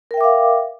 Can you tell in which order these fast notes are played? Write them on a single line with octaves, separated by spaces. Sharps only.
A#4 G5 E5 D6 F5